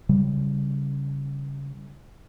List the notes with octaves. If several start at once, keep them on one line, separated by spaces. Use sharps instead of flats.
C#3 G3